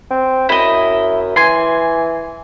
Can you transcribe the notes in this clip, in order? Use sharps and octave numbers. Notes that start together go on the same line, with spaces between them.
C4
F#2 E4 D#5
E3 G#5 C6